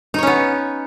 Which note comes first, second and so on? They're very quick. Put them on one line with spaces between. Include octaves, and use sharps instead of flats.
D#4 C#5 C#4 B3